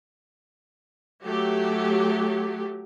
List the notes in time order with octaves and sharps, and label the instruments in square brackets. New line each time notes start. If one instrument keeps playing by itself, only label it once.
[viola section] F#3 A3 G4